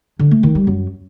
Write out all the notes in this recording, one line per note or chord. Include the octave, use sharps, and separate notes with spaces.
D3
A3
D#3
G3
F#2